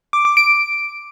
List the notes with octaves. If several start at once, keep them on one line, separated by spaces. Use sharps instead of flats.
D6
D6
D7